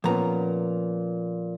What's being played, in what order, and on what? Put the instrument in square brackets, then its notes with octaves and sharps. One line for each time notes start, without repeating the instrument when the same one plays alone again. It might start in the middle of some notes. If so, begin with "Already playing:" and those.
[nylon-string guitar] A#2 B3 C#4 [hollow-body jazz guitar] F3 A#5